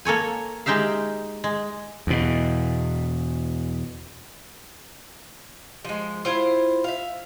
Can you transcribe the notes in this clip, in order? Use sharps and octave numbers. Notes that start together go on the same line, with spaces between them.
A#3 A4 C#5 G#5
G#3 D#4 G4 E5 F5
G#3
E2 B2
F3 G#3
E4 F4 C5
E5 F5